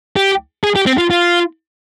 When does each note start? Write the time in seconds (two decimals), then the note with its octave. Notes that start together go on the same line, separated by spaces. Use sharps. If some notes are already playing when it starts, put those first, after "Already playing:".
0.16 G4
0.64 G#4
0.76 G4
0.86 C4
0.98 F4
1.10 F4